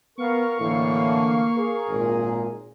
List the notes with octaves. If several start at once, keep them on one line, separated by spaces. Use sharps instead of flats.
B3 A#4 F5 C#6
A2 D3 E3 A#3
G#4 A#4
G#1 A#2